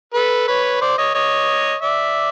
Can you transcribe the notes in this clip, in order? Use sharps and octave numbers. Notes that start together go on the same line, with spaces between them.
A4 B4
B4 C#5
C5 D5
C#5 D#5
C#5 D#5
D5 E5